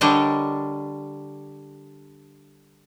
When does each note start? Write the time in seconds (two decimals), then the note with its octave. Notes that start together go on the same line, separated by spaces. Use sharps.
0.01 D3 G3 D4 A#4 C#5 D#5